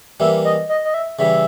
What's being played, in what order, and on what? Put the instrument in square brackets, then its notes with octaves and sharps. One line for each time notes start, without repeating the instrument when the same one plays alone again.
[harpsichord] E3 G3 A#3 [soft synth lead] E5
[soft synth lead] D#5
D#5
D#5
E5
[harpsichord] C#3 E3 G3 [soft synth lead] E5